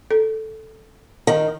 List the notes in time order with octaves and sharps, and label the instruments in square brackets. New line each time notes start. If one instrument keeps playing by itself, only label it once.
[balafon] A4
[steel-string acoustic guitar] D#3